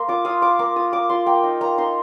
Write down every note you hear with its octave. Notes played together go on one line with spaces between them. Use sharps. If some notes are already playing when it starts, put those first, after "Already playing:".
Already playing: A#3 C6
F4 D6
F4 D#6
F4 D6
A#3 D6
F4 D#6
A#3 D6
F4 C6
A#3 G5
D#4
A#3 A#5
D#4 C6